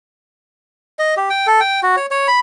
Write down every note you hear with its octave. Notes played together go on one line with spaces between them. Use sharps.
D#5
G4
G5
A4
G5
F#4
C#5
C#5
B5